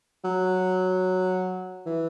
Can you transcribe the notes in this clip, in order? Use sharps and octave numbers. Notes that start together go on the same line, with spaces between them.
F#3
E3